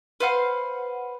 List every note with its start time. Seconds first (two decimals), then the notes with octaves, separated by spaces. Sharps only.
0.20 B4 C5 F5 F#5